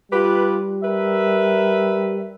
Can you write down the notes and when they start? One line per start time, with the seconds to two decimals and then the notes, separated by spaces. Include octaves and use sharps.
0.12 G3 F4 G4 B4
0.82 A#4 B4 E5